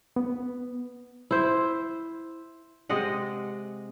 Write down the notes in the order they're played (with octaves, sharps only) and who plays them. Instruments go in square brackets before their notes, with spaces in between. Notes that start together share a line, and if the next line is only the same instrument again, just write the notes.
[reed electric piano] B3
[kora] E4 C5
C3 G#3 D#5 F#5